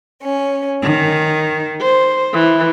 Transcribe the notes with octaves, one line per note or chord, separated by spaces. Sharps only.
C#4
D#3
C5
E3